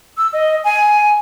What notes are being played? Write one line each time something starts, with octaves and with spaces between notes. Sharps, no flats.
E6
D#5
G#5